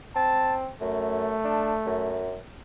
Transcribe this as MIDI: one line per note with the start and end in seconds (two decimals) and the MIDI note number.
0.16 0.70 60
0.16 0.56 81
0.81 1.37 42
0.81 2.31 57
1.45 1.74 62
1.86 2.36 42